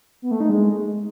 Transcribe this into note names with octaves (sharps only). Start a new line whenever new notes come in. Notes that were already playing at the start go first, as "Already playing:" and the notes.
B3
A3
D#4
G#3